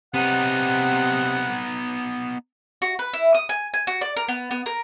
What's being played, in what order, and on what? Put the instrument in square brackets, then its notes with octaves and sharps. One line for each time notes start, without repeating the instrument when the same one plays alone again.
[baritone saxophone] C3 [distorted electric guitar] B3 D#4 [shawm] F#5
[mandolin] F#4
B4
E4
D#6
G#5
G#5
F#4
D5
A#4
B3
B3
A#4